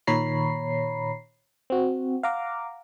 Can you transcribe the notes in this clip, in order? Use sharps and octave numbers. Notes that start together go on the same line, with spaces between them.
A#2 D#3 C#5 A#5 B5 C7
C4 F#4
F5 F#5 A#5 D6